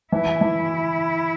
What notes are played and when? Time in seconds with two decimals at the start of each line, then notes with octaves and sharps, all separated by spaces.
0.12 E3 E4
0.41 E3